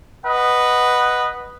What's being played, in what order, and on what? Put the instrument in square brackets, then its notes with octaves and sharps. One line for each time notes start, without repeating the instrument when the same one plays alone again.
[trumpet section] B4 D#5 F#5